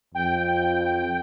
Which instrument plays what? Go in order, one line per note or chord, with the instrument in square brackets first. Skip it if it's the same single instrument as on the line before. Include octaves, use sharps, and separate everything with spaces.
[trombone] F2 [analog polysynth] G5